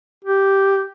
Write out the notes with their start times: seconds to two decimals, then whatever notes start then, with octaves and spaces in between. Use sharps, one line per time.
0.25 G4